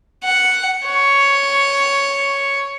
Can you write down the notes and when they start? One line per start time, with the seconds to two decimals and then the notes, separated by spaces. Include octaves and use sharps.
0.24 F#5
0.87 C#5